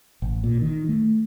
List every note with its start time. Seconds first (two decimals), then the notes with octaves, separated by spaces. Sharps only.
0.22 A1
0.44 A#2
0.61 D#3
0.89 A3